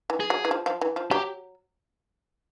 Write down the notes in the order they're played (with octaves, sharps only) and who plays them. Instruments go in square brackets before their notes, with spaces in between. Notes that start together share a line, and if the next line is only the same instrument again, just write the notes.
[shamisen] E3
[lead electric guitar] G#4
[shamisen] F#3
E3
F3
F3
E3
F3
[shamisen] F#3 [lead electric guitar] G4